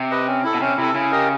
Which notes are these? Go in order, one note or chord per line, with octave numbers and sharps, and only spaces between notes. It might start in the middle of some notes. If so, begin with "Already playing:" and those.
Already playing: C3
G4 B4 D#5
C#4
E4 A4
B2
C3 C#4
C3 E4 A4
C#3 E4
G4 A#4 D#5